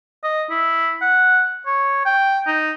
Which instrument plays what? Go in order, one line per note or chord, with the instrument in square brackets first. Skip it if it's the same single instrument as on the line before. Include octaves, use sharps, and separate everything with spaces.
[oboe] D#5
E4
F#5
C#5
G5
D#4